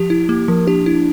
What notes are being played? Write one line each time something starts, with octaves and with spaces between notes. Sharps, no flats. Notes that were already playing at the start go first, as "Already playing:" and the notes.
Already playing: F3 G4
E4
A#3 G4
F3 A#4
D4 G4
E4